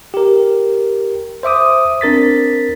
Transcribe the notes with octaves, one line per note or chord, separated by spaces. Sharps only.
G4 A#4
C5 E5 D6 D#6
C4 D4 A#4 A6 B6